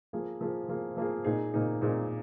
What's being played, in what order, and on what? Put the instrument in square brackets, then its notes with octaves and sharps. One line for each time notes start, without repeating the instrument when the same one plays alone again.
[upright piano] F3 A#3 F4 G#4
F3 A#3 F4 G#4
F3 A#3 F4 G#4
F3 A#3 F4 G#4
A#2 A#3 D#4 G#4
A#2 A#3 D#4 G#4
A#2 A#3 D#4 G#4